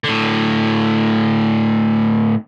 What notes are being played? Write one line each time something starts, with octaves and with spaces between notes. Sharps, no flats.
A2 D3